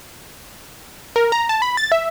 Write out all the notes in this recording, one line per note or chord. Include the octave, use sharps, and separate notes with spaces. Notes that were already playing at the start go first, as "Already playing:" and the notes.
A#4
A#5
A5
B5
A6
E5